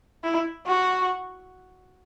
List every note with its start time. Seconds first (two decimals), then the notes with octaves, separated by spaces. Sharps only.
0.24 E4
0.67 F#4